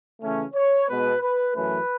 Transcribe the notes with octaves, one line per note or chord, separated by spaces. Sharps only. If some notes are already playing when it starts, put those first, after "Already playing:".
C#3 E3 A3 C#4
C#5
B2 G#3 B3 B4
B4
F#2 E3 A3 C#4 B4